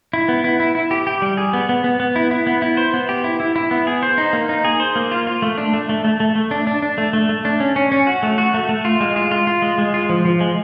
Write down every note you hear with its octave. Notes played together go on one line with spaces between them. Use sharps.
E4
B3
E4
E4
E4
G4
G4
G3
G#4
B3
B3
B3
B3
E4
E4
B3
E4
C5
B3
G4
E4
E4
E4
B3
G#4
C5
D#4
A#3
D#4
G#4
C5
A#3
F4
F4
A3
D4
A3
A3
A3
A3
A3
D4
D4
D4
A3
A3
A3
D4
C#4
C#4
C#4
F#4
A3
F#4
A3
A3
F4
G#3
F4
F4
F4
G#3
G#3
F4
F3
F3
G#3